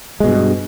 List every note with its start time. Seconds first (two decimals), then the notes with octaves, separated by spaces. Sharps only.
0.20 G#3
0.24 B2
0.27 G2